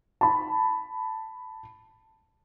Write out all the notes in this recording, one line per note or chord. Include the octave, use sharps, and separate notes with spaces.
A5 B5